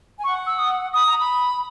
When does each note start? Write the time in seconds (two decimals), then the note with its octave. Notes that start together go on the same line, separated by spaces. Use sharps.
0.18 G#5
0.24 F#5 C#6
0.47 E6
0.59 D#6
0.93 B5 D#6
1.06 A#5
1.17 B5